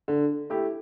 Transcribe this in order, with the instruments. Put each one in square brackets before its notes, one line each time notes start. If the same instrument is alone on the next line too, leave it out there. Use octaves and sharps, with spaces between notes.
[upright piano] D3
A3 E4 G4